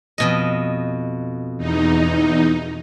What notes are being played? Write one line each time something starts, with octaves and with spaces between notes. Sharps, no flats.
F2 B2 D#5
E2 D#4